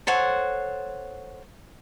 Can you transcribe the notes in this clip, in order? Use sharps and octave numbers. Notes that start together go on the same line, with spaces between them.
A4 C5 C#5 F#5